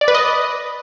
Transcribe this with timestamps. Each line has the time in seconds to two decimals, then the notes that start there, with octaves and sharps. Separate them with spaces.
0.01 D5
0.08 B4
0.14 D#5